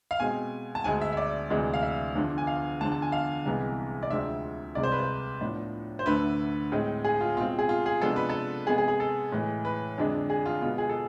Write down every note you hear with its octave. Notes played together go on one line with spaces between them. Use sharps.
F5
B2 G#3 C4 G#5
A5
D2 D3 G#3 G#5
E5
E5
D5
D2 C3 E3 G#3 D4
F5
E5
E2 D3 F3
G#5
F5
E2 D3 F3 A5
A5
G#5
F5
C2 C3 E3 G#3 B3
D5
D2 C3 F3 G#3 C4 E5
C2 C3 G#3 D5
C5
B4
C5
A2 F3 B3 D4
C5
D2 D3 A3 B4
A2 G#3 C4
G#4
F4
B2 G#3 C4 F4
G#4
F4
G#4
C3 F3 G#3 B3 D4 A4
B4
A4
C3 G#3 B3 G#4
G#4
G#4
A4
A2 E3 G#3
B4
F2 D3 G#3 D4
G#4
F4
B2 G#3 B3 F4
G#4
A4